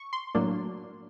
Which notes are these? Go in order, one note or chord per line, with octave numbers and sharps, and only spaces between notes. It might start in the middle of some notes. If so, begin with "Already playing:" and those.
Already playing: C#6
C6
A2 F#3 A#3 D4